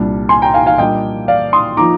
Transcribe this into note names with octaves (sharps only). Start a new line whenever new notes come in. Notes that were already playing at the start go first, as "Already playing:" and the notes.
Already playing: C2 A#2 G3 D4
G#5 C6
G5 A#5
F5 G#5
F5 G#5
A#2 G3 A#3 D4 D#5 G5
D5 F5
C6 D#6
F3 A#3 D#4 A#5 D6